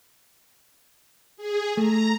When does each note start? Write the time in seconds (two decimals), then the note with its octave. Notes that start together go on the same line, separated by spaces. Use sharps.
1.37 G#4
1.77 A3 A#5